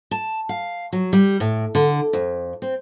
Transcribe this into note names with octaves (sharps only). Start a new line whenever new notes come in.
A5
F5
F#3
G3
A2
D3
F2
C4